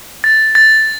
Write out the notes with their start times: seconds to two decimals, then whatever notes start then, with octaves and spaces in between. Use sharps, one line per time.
0.24 A6
0.55 A6